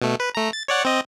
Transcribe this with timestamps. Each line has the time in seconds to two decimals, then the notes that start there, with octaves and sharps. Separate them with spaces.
0.02 B2 A3
0.20 B4
0.35 A3 A#5
0.53 A6
0.68 C#5 D5 F#5
0.85 C4 D#5